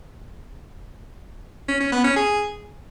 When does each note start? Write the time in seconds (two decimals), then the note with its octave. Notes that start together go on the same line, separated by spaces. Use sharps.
1.68 C#4
1.80 C#4
1.92 B3
2.04 C#4
2.16 G#4